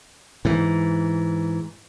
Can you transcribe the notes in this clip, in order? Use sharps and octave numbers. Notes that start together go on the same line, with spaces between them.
G#2 E3